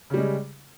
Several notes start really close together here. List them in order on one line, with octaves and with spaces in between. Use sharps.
C#3 G3 G#3